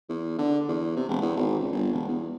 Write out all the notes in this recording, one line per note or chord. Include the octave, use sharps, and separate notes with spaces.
E2
D3
E2
C3
E1
E2
G#1
C#2
G1
E1
E2